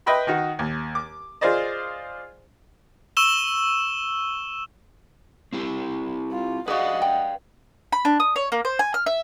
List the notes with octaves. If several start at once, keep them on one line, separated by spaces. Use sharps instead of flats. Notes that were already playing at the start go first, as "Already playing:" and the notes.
B4 D#5 E5 G5 B5 C6
D#3 D#4 F#4
D#2
D6
F4 G#4 C5 D5 D#5
C#6 E6 E7 G7
C4 E4 G4
F4
F#4 G#4 B4 D5 D#5 F5 F#5
G5
B5
D4
D#6
C#5
A#3
C5
G#5
F6
E5